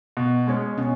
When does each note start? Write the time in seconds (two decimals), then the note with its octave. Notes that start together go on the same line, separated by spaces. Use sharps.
0.17 B2
0.47 G#3 C#4
0.78 B2 C#4